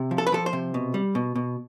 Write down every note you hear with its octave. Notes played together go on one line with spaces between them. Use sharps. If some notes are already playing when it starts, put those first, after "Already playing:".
Already playing: C3
F3
A4
B4
F3 A4
C5
C3
B2
G3
B2
B2